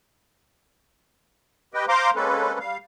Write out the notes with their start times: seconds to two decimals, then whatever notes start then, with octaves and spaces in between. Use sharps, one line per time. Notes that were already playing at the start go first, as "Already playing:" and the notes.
1.74 G4 B4 D#5 G5
1.88 C5 F5 A#5 C6 D6
2.16 G#3 A#3 C4 C#4 A4 B4
2.59 G3 F5